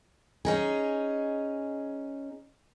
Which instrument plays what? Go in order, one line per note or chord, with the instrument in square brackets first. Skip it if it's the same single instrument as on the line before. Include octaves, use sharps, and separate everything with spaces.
[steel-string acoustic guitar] C#4 D#4 G#4